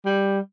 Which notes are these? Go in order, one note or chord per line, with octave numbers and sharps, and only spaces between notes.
G3